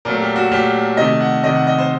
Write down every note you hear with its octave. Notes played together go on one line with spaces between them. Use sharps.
A#2 F#3 A3 A#4
G4
F#4
A#2 F#3 A3 G4
C3 D#3 A3 D#5
F#5
C3 D#3 A3 D#5
F#5
D#5
C5